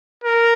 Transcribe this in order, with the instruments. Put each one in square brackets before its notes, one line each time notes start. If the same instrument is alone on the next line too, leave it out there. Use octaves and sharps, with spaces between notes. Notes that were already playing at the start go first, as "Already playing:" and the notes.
[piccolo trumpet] A#4